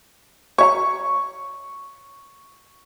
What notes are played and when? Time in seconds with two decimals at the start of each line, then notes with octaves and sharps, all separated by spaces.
0.58 C#5 E5 A#5 C#6